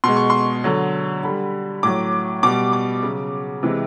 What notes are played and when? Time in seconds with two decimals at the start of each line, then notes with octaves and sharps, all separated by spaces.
0.04 B2 G#3 C6
0.16 C#6
0.30 C6
0.64 D3 F#3
1.23 D3 G3 B5
1.83 A2 F#3 D6
2.43 B2 G3 D6
2.73 D6
3.03 C#3 F#3
3.63 C3 E3 G#3